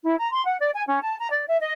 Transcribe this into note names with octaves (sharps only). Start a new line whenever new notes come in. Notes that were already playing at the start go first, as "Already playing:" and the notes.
E4
A#5
C6
F#5
D5
G#5
C#4
A5
A#5
D5
E5
D#5